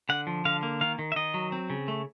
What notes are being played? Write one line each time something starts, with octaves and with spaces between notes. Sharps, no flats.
D3 F#5
F3
D3 F5
A#3
D#3 F5
D#3
E5
D#3 D#5
F#3
C4
C#3
A3